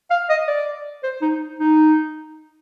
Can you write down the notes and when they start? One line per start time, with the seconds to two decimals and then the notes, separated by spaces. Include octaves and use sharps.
0.11 F5
0.30 D#5
0.48 D5
1.03 C5
1.22 D#4
1.59 D#4